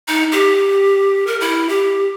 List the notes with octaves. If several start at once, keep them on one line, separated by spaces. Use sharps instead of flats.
D#4
G4
A#4
E4
G4